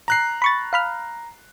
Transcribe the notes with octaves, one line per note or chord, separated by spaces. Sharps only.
A#5 F#6 C7
B5 C#6 A6
F5 B5 F6